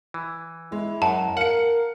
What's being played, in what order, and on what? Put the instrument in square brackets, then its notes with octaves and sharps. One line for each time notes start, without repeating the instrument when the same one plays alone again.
[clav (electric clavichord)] E3
[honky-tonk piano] G#3 [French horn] E4
[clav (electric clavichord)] F#2 [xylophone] A5
[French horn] A#4 [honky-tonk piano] F5 C#7 [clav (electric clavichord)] F#5